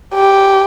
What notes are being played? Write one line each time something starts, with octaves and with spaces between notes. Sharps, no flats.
G4